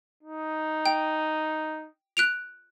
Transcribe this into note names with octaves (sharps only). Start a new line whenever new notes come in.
D#4
G5
F#6 D7 F7